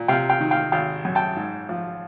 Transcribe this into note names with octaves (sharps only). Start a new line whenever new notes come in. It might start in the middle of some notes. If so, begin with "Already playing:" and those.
Already playing: A#2
C3 F5 G5
F5 G5
D#3
F5 G5
G#1 F5 G5
F#2
G5 A5
G#2
F3